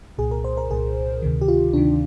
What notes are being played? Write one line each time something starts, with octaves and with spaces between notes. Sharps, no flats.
C2 A#2 G#4
A#4
C5
A#4
C2 A#2 G#4
D2 C3 D#3
G4
F4
D2 C3 D#3 D4